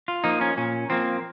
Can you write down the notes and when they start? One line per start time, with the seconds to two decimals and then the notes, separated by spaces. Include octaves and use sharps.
0.08 F4
0.24 F3 A#3 D#4
0.41 C#4
0.57 A#2 C#4
0.90 F3 A#3 C4